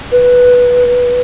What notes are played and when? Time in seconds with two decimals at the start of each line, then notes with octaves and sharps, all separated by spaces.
0.12 B4